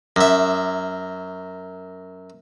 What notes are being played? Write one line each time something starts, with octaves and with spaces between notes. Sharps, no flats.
F#2 E5